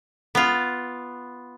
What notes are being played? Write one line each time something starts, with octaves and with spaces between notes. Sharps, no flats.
B3 F4